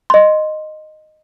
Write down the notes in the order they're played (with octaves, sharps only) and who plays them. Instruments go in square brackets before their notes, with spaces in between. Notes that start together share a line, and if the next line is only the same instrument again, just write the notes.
[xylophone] D#5 C6